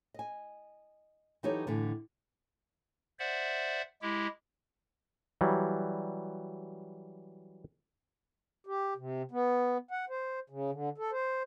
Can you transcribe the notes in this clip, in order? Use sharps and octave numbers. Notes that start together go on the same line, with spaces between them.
D#5 G#5
E3 F#3 D#4 G4 A4 C#5
A2 D3 E3
C5 D5 E5 F#5
G#3 E4 G4
E3 F#3 G3
G4
C3
B3
F#5
C5
C#3
D3
A4
C5